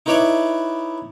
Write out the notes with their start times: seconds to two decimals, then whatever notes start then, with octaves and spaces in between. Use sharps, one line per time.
0.06 D#4 E4 B4 C#5 D5 E5